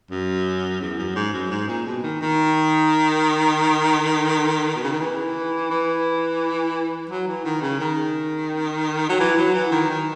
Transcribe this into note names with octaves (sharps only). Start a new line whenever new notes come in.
F#2
E2
F#2
G#2
F#2
G#2
A#2
B2
D#3
D#3
B2
C#3
D#3
E3
E3
F#3
E3
D#3
C#3
D#3
F#3
E3
F#3
E3
D#3
D#3